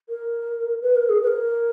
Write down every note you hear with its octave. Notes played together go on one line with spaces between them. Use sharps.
A#4
B4
A#4
G#4
B4
A#4